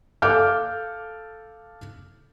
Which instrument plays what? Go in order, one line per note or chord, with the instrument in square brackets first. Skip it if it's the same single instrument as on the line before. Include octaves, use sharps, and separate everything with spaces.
[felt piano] A4 F5 D6 F6 G6